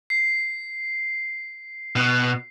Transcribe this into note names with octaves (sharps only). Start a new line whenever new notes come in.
C7
B2